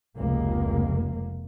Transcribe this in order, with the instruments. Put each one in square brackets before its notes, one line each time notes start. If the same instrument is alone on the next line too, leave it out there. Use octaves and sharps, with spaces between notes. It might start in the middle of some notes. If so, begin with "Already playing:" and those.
[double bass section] F1 C#2 A#3